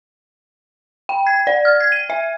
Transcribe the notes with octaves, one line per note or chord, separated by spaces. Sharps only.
G5
G#6
D5
F6
G#6
D#7
E5